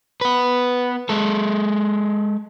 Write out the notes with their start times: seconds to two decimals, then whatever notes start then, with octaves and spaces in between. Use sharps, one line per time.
0.21 B3 B4
1.09 G#3 A4